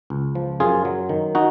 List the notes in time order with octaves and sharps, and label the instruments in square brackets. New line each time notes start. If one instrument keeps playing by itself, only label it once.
[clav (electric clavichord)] C#2
F3
F#2 F4 G#4
F#3
D#3
D#4 F#4